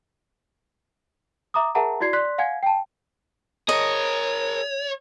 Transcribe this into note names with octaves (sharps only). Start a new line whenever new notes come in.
E5 A#5 D6 D#6
G#4 A#4 E5 F#5 A5 A#5
E4 F#4 D5 G#6 C7
D5 C6 F#6 B6
F5 F#5 G#5 G#6
G5 A5
G#4 A#4 C#5 D#5